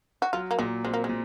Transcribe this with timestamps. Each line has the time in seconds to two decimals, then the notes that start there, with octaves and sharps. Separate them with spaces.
0.22 F#4
0.33 F#3 F4
0.51 A#3
0.59 A#2 G#3
0.84 G#3 C4
0.94 A#3
1.04 G#3
1.09 A#2